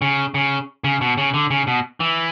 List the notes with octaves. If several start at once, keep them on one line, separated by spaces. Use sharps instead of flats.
C#3
C#3
C#3
B2
C#3
D3
C#3
B2
E3